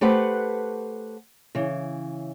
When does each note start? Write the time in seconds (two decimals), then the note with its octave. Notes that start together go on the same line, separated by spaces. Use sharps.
0.01 A3 G4 B4 C5 F#5
1.55 C#3 E3